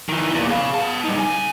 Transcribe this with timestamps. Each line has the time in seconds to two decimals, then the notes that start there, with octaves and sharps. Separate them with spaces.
0.09 D#3 E3
0.34 E2 A#2
0.50 G#4 F5
0.74 B3 A5
1.05 G3 D#4
1.17 C#3 G#5